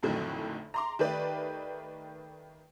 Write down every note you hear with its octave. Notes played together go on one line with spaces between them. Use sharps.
A#1 F2 A2 D3 D#3 F#3
A#5 C6 D6
D#3 A3 G4 B4 D5